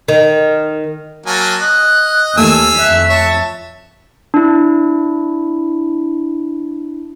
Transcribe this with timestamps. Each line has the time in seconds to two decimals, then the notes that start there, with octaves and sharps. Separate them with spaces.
0.08 D#3
1.26 F#3 A#3 G#5 A5
1.61 D#5 F#6
2.37 D#2 A3 F5 G#5 E6
2.79 F2 E5 F#6
3.10 C#5 A5
4.34 D4 E4